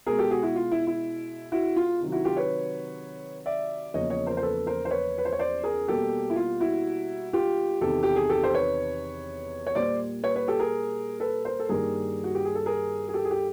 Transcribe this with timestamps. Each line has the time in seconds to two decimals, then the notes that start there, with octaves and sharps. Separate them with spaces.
0.06 B2 G#3 G#4 A#4
0.19 G4 A4
0.31 F#4 G#4
0.43 E4 F#4
0.55 F4
0.72 E4
0.87 E4
1.52 E4 F#4
1.76 F4
2.00 C3 D#3 F#3
2.12 E4 F#4
2.25 F4 G4
2.37 B4 C#5
3.46 D5 E5
3.94 E2 C#3 F3 A#3 C#5 D#5
4.10 C#5 D#5
4.26 A#4 C5
4.37 C5
4.43 A4 B4
4.67 A#4 C5
4.85 C5
4.91 B4 C#5
5.18 B4
5.25 C5
5.32 C#5
5.39 C5 D5
5.64 G#4 A#4
5.88 B2 G3 A#3 G4 A4
6.30 E4
6.36 F4
6.60 E4 F#4
7.33 F4 G4
7.81 E2 C3 D#3 G4 A4
8.03 G4
8.16 G#4
8.29 G4 A4
8.44 C5
8.54 B4 C#5
9.67 C#5
9.75 A#2 G3 A#3 C5 D5
10.24 B4 C#5
10.36 B4 C#5
10.48 G4 A4
10.59 G#4 A#4
11.20 A4 B4
11.45 A#4 C5
11.59 A4
11.69 G2 D#3 G3 A#3 G#4 A#4
12.24 F#4
12.35 G4
12.45 G#4
12.55 A4
12.66 G#4 A#4
13.09 G#4
13.14 G4 A4
13.25 G#4
13.30 G4 A4